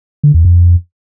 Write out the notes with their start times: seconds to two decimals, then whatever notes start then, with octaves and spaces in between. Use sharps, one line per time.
0.24 D3
0.34 E2
0.45 F2